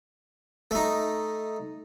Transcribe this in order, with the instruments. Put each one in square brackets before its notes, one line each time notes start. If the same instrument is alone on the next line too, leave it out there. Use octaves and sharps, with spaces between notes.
[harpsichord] A3 D#4